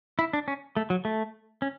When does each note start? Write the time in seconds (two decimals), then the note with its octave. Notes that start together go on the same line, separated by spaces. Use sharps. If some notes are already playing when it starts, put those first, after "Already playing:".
0.19 E4
0.33 D4
0.48 C#4
0.77 A3
0.90 F#3
1.05 A3
1.62 C#4